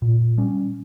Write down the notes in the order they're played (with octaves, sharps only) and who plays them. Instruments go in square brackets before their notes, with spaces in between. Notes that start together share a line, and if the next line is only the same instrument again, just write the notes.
[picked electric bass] A#2
G3 C#4